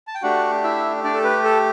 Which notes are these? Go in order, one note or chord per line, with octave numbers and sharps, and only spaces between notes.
A5
G5
A3 D4 F#4 G4 F#5
E4 E5
D4 D5
A4
B4
A4